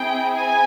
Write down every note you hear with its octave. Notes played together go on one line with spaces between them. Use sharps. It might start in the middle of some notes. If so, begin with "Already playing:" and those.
Already playing: C4 E4 G#4 G5
G#5